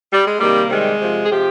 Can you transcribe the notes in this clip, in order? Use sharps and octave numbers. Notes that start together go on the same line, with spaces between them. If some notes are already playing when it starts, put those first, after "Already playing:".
G3
G#3
C3 D#3 G3 A#3
C3 D#3 G3 G#3
C3 F3
G#4
C3 F3 G4